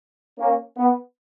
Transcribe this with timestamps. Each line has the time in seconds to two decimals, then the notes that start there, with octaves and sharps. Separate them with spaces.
0.38 A#3 C#4
0.75 B3